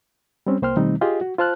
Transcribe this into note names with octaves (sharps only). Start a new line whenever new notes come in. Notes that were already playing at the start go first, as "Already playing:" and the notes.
G3 C4 C#4
C2 A#3 C5 G5 C6 F6
B2 D#3 G3 A3 C4 D#4
F4 G4 G#4 D#5
F#4
F4 C5 A5 F6 F#6